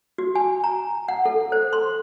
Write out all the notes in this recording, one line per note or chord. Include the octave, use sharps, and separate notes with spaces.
F#4
G#5
A#5
F#5
A4
C5
C6